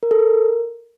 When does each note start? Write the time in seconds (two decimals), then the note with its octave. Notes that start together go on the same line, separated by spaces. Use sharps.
0.03 A#4
0.11 A4
0.19 A#4